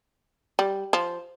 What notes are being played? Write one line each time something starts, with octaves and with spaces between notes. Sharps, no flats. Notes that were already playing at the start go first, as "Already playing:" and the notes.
G3
F3